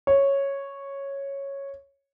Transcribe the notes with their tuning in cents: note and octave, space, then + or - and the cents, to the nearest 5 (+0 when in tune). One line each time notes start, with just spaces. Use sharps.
C#5 -5